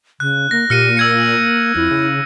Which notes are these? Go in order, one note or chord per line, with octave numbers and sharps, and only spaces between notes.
C#3 F#6
A#3 A#6
A#2 G4 F6 C#7 D#7
A#3 E6 G#6 C#7
F2 E4
C#3